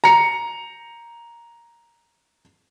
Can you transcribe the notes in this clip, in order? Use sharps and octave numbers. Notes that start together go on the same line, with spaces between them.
A#5 C#7